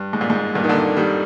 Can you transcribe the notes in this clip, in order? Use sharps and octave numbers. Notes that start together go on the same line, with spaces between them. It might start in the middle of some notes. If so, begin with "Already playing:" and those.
Already playing: G2
G#2
A#2
G#2
G2 A#2
D#3
A#2 D3
D#3 G3